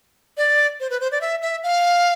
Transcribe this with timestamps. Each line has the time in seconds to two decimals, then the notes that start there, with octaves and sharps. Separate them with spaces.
0.37 D5
0.80 C5
0.90 B4
1.01 C5
1.12 D5
1.21 E5
1.42 E5
1.63 F5